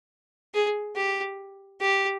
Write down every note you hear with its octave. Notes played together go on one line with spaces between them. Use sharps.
G#4
G4
G4